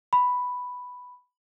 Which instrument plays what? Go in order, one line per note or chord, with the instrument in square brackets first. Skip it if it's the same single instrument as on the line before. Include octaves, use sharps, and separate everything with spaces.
[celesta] B5